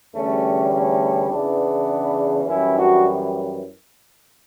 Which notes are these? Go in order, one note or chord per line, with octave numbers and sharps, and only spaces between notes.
E2 D3 G3 A3 C#4
A3 C#4
E2 C#3 E3 B3 D4
F#2 E3 G3 C#4 E4
D4 F#4